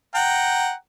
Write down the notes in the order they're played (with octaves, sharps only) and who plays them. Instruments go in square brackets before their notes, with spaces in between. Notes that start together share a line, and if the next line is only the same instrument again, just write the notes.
[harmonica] F#5 G5 A#5